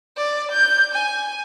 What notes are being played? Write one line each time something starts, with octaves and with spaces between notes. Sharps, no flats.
D5
G6
G#5